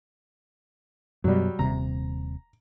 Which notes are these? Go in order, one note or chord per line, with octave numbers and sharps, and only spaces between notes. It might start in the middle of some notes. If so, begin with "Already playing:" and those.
F#2 B2 F#3 G3
D#1 C3 A#5